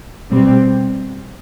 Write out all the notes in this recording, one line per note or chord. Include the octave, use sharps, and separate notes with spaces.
B2 G3 C4